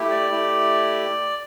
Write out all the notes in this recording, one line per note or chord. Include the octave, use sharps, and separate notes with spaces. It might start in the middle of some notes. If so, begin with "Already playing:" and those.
Already playing: A3 E4 G4
D5
A3 E4 G4